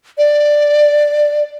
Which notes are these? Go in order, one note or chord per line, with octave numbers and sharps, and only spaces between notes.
D5